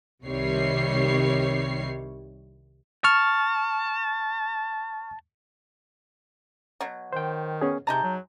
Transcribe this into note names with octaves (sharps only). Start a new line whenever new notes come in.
C2 C3 D#3 G3 C#5 C7
A5 C#6 F6
B2 F#3
D#3 C5 G5
B3 C#4 G#4
C3 G#3 D#4 A5 A#5 G6
F#3